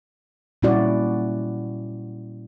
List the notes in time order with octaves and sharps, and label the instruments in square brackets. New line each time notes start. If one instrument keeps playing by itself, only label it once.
[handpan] A#2 G3 C#4 E4 F#4 D5